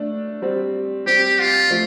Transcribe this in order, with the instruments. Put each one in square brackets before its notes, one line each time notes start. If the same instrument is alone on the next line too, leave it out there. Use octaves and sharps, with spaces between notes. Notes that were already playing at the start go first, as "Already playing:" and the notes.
Already playing: [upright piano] A3 D4
G3 C4
[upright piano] G3 C4 [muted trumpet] G4
[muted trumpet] F4
[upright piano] F3 A3